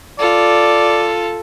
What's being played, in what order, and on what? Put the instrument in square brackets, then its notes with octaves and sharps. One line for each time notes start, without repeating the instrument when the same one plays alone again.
[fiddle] F4 A4 [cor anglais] D5